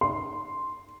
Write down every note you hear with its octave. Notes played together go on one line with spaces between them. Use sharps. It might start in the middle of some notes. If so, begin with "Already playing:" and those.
C6